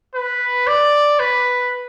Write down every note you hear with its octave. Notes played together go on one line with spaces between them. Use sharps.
B4
D5
B4